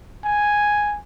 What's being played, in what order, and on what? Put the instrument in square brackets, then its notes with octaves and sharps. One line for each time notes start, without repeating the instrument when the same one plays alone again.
[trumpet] G#5